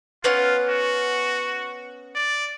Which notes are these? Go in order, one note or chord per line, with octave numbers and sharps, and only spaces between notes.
B3 C#4 F4 F#5
F#4
D5